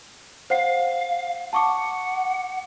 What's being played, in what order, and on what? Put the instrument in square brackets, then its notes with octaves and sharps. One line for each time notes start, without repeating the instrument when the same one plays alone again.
[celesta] C5 F#5 C7 [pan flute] F5
[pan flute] F#5 [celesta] A5 C#6 D6